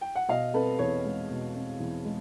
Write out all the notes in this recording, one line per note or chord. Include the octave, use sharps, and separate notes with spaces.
G5
F#5
B2 D#5 F5
C4 A4 B4
E2 B4 C#5
G#3
B2
C4
E2
G#3